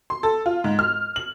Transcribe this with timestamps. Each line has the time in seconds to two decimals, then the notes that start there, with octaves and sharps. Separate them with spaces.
0.10 C6
0.23 A4
0.46 F4
0.64 G#2
0.79 F6
1.16 F#7